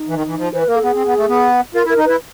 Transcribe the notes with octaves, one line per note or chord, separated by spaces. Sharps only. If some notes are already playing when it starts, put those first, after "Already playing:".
Already playing: D#4
E3
D#3
E3
F3
E3 C5
B4
A#3 A#4
A4
B3 G#4
C4
B3
A3
B3
F4 A#4
E4
A#4
D#4
E4 B4